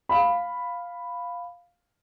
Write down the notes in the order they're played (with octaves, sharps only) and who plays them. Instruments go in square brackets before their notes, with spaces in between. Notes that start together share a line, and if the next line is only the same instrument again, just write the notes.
[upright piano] F5 B5